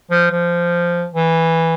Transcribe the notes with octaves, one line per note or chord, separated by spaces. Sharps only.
F3
F3
E3